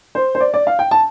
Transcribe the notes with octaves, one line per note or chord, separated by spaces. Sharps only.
C5
C5
D5
D5
F5
G5
A5